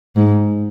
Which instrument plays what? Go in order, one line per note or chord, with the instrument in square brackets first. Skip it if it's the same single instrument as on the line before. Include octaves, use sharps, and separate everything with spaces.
[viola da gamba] G#2